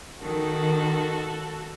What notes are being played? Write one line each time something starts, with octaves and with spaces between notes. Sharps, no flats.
D#3 F#4 A4